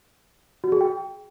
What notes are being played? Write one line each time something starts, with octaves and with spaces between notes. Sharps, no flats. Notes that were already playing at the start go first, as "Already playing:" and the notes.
F#4
G#4
G5